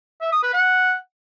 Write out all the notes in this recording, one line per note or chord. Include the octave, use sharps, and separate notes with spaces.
E5
D#6
B4
F#5